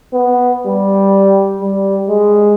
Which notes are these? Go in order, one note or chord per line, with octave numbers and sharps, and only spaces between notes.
B3
G3
G3
G#3